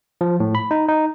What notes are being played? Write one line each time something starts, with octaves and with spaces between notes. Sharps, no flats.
F3
A2
B5
D#4
D#4